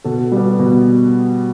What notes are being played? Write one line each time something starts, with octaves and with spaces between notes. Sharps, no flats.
B2 A4
G3 B3
B2